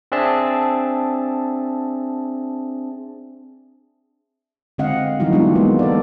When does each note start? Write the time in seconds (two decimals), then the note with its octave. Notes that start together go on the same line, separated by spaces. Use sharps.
0.12 C4 D4 G#4 E5 A5
4.78 D3 G#3 C4 D#5 F5 F#5
5.20 E3 F#3 G3 D#4 E4 F#4
5.32 G#3 B3 D4 E4 F4 G4
5.55 G#3 A#3 B3
5.79 A4 D5